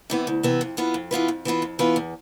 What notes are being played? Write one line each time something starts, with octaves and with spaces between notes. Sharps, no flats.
C3 E3 B3
D2
C3 E3 B3
F2
E3 B3 F4 B4
F2
E3 B3 F4 B4
F2
E3 B3 F4 B4
F2
E3 B3 F4 B4
E2